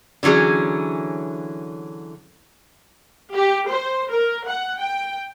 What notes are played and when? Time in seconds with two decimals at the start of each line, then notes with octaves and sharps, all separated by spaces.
0.23 D3 E3 F#3 C#4 G#4
3.36 G4
3.69 C5
4.11 A#4
4.47 F#5
4.79 G5